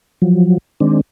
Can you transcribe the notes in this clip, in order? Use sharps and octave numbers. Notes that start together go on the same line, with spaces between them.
F3 F#3
D#3 G#3 C4 D4